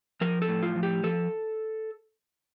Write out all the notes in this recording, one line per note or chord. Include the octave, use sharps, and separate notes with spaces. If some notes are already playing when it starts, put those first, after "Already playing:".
F3 A#4
A4
A2
F4
F3
G4
F3 A4